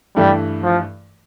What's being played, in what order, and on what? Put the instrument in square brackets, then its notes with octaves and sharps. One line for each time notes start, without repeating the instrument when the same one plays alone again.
[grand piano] G2 E3 A3 [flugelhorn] G3
[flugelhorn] F3